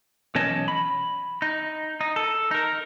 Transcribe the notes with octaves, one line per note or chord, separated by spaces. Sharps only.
B1 E3 C#4 C#5 D#5 A5
B5
D#4
D#4
A4
D#4 A#4